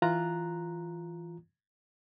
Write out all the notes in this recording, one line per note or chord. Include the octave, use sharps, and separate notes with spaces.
E3 F4 A#5 F#6